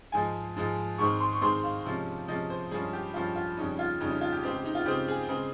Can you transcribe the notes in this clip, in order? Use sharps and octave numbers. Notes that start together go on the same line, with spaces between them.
G#2 F3 G#3 G#5
G#2 F3 G#3
G#2 D#3 G#3 C4 C#6
C6
C#6
G#2 D#3 G#3 C4 C6
F5
C3 F3 G#3 C#4
C3 F3 G#3 C#4 D#5
C5
G2 F3 G#3 C#4 G#4
G4
G2 F3 G#3 C#4 F4
F4
F2 C#3 G3 C#4 D#4
F4
F2 C#3 G3 C#4 D#4
D#4
F4
G4
C#3 G#3 C4 G4
G4
D#4
F4
C#3 G#3 C4 G4
G#4
C#3 G#3 C4